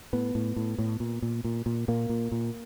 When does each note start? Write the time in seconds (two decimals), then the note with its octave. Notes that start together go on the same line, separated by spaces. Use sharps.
0.13 A2 B3
0.35 A2
0.56 A2
0.78 A2
1.00 A#2
1.22 A#2
1.44 A#2
1.66 A#2
1.88 A#2 A#3
2.09 A#2
2.32 A#2